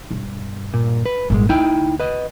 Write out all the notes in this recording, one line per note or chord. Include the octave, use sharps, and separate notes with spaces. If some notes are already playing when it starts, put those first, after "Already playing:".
E1 G2
A#2
B4
G#1 A#2 G3 G#3
D2 D#4 E4 G5
B4 D#5